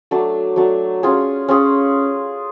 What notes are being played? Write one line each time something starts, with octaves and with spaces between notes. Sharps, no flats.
F#3 A3 D4
F#3 A3 D4
C#4 F4 G#4
C#4 F4 G#4